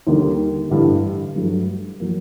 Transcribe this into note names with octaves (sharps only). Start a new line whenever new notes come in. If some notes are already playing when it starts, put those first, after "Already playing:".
D#2 D3 G3 A#3
A1 G2 D3 G3
G2 F#3 A3
F#3 A#3